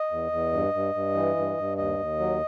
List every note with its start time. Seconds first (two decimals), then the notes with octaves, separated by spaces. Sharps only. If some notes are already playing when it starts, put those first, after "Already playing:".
Already playing: D#5
0.11 E2
0.32 E2
0.53 G2
0.74 G2
0.95 G2
1.15 E3
1.37 G2
1.58 G2
1.78 D#2 D#5
1.99 D#2
2.20 F#3